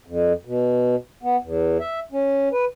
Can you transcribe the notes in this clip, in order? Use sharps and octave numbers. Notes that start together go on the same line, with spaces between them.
F2
B2
B3
E2
E5
C#4
B4